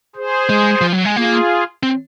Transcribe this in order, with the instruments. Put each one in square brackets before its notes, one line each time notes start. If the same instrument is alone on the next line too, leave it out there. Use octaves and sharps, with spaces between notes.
[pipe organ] G#4 C5
[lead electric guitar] G#3
F3
F#3
G#3
[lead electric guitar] A#3 [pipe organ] F4 G#4
[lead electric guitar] C4